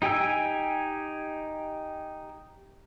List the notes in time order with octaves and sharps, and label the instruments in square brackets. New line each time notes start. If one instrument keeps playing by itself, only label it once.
[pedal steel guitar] D#4 G4 G5 G#5 E6